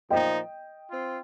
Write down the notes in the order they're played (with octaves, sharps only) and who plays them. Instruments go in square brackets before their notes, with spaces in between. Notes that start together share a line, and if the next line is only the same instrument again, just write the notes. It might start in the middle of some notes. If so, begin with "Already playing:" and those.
[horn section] A#2 F3 D#4 [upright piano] D#5 G5
[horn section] C4 F4